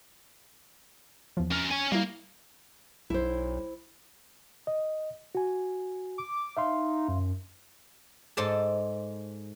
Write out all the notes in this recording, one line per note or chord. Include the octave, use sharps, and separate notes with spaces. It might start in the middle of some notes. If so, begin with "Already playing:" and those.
E2 F3
C#4 A#4
C#5 G#5
G3 A#3 E4
B1 E4 C5
D#5
F#4 G#5
D6
D#4 E5 F5 C6
F#2
G#2 D#4 A4 C5 D5 A5